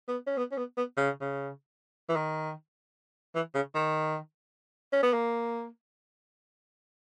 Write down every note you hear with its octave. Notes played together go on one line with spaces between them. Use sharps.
B3
C#4
B3
C#4
B3
B3
C#3
C#3
E3
D#3
E3
C#3
D#3
C#4
B3
A#3